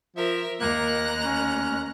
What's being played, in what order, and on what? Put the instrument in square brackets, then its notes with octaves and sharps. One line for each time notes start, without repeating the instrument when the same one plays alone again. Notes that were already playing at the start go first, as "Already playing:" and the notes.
[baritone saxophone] F3 [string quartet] A#4 E5
[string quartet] D#2 A#5 F#6 [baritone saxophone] A#3
[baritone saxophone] C#4